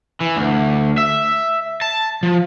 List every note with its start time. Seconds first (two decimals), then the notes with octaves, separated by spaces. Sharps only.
0.20 E3
0.36 D2
0.98 E5
1.81 A5
2.23 F3